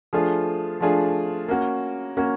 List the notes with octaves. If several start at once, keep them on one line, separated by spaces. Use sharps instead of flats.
F3 A3 D4 F4 G#4
F3 A3 D4 F4 G#4
A#3 C#4 F#4
A#3 C#4 F#4